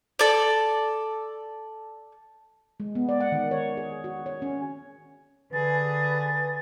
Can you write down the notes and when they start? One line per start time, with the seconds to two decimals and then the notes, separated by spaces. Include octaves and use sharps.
0.19 A4 D5
2.80 G#3
2.95 B3
3.09 D5
3.20 F#5
3.32 D#3
3.51 C#5
3.77 G#4
4.04 F#4
4.26 C#5
4.42 C#4
5.53 D3 G#4 B4 A6